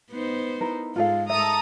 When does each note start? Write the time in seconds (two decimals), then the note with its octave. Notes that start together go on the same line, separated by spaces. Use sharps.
0.11 B3 D#4 C5
0.61 E4 A#4 B4
0.96 G#2 G#3 F4 A4 F5
1.30 A4 E5 A#5 D#6